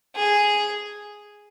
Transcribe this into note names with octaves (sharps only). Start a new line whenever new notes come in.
G#4